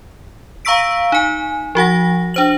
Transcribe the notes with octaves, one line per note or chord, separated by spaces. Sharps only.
F5 A#5 C#6 E6 B6 D7
D#4 G#5
F3 F#4 F#5 A#6
D4 C5 F#7